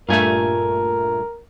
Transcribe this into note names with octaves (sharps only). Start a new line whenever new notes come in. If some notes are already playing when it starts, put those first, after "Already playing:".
G2 A#2 A3 F4 A#4 G#5